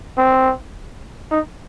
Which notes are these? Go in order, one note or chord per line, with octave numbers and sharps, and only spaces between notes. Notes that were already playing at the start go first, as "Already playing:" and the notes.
C4
D#4